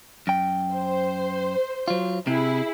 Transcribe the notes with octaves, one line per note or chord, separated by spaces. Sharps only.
F#2 G5
C5
F#3 F4
C3 E4 G#4